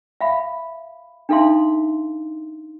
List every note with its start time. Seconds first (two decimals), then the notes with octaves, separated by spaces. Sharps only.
0.21 E5 F5 B5
1.29 D4 D#4 A4 E5 F5 C6